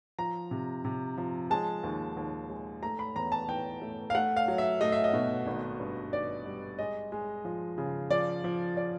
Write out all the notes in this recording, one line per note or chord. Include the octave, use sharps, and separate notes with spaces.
F3 A#5
C3
C3
F3
G#3 A5
D#2
D#2
G#3
A3 A#5
B5
E2 A#5
A5
E3 G5
A3
F5
A3 F#5
F5
F#3
E5
A3 D#5
E5
D#5
B2
G#1
G2
G#1 D5
G3
G#3 D#5
G#3
F3
C#3
F3 D5
F3
D5